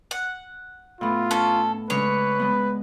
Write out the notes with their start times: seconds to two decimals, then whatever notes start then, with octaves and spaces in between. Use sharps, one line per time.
0.11 F#5
1.01 A2 B3 F4
1.31 C#4 A4
1.90 C#3 G#3 D4 B4 C#5
2.40 G#3 B3